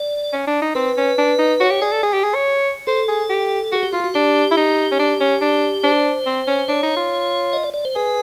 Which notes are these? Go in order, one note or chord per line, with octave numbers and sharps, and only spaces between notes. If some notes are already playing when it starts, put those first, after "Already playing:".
Already playing: D5
C#4
D4
D#4
C4 B4
C#4
D4
D#4
F#4 C#5
G4
G#4 D5
A4
G#4
G4
G#4
C#5
A4 C5
G#4
G4
F#4 G#4
G4
F4 F#4
F#4
D4 G4
E4
D#4
C#4
D4
C#4
D4
D4 C5
C4
C#4
D4 C#5
D#4
F4
D#5
D5
D5
C5
G#4 B4